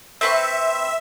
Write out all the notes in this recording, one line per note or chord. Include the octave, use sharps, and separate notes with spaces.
C4 B4 E5 C#6